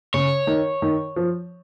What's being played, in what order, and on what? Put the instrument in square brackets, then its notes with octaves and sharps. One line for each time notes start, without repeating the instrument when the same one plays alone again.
[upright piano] C#3 [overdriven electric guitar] C#5
[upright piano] D#3
D#3
F3